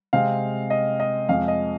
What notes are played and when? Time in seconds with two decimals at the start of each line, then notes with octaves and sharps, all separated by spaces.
0.13 C3 G#3 C4 F5
0.70 D#5
1.00 D#5
1.29 F2 F3 G#3 F5
1.48 D#5